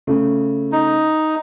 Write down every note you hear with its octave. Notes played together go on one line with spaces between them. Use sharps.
C#3 A3
D#4